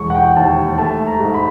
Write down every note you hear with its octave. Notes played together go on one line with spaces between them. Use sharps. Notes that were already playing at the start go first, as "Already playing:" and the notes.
Already playing: E1 C#6
F#5
G5
D#2 A5
A3 A5
A#5
G#2
B5